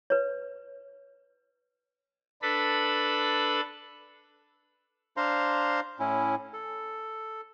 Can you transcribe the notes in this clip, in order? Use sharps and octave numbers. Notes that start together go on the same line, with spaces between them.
B4 C#5
D4 A4 B4 B5
D4 C5 F5 A#5 C6
A2 C#4 E4
A4